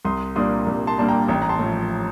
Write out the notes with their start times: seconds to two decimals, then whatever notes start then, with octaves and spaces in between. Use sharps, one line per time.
0.05 C2 C6 D#6
0.36 A#2 G3 A#3 D4 C6 D#6
0.67 C2
0.87 A5 C6
0.98 A#2 G3 A#3 D4 A5
1.08 G5 A#5
1.28 A1 G5 A#5
1.42 A#5
1.49 A5 C6
1.59 A2 F3